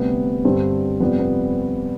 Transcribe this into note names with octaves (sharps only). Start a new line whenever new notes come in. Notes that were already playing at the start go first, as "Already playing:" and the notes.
Already playing: D2 C3 G3 B3
G2 D3 G3 C4
F2 C3 G3 B3
B3